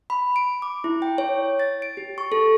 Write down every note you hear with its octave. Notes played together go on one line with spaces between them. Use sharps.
B5
D7
D6
E4
G5
C#5
A6
D7
G4
C#6
A4